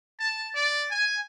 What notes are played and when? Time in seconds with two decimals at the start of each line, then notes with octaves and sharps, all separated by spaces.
0.20 A5
0.55 D5
0.90 G#5